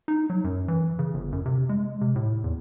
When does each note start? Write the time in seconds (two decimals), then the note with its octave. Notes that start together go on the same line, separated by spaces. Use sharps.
0.08 D#4
0.30 F#3
0.44 F#2
0.68 E3
0.99 C#3
1.14 G1
1.32 F#2
1.46 C3
1.69 G#3
2.01 C3
2.16 A2
2.44 E2